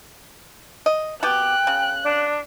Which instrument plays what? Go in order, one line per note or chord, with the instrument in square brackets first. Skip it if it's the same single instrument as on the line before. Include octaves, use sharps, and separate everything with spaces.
[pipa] D#5
[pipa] B2 G4 [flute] G5 [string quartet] F#6
[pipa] C#3
[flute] D4